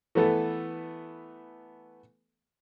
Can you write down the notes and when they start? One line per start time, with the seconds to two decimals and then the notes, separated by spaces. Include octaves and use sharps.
0.15 E3 A3 B3 A4